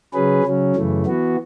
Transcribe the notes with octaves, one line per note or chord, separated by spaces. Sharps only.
C#3 F#3 C#4 G#4 B4
C#3 F#3 C#4
F#2 C#3 E3 A3
E3 B3 F#4